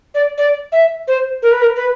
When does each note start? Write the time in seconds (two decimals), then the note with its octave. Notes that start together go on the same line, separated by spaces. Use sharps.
0.14 D5
0.38 D5
0.72 E5
1.07 C5
1.42 A#4
1.51 B4
1.61 A#4
1.76 B4